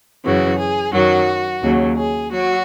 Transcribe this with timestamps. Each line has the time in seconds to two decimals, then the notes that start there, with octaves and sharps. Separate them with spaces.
0.24 F#2 C#3 E3 F#4
0.58 G#4
0.93 F#2 D#3 F#3 F#4
1.62 D#2 C#3 F#3
1.97 G#4
2.31 F#3 F#4